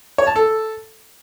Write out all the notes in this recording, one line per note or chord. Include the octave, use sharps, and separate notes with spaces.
C#5
A5
A4